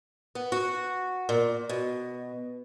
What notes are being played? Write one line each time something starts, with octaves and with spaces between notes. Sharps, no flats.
B3
F#4
A#2
B2